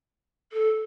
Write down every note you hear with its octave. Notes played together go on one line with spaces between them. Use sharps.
A4